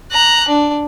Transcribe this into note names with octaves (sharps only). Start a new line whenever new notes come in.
A#5 F#6
D4